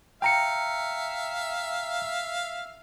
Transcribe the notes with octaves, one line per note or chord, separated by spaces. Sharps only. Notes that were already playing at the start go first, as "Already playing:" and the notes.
E5 F5 G5 A#5 C#7